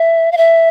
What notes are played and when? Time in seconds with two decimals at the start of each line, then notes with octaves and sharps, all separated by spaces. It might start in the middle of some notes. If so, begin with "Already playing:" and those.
Already playing: E5
0.32 F5
0.37 E5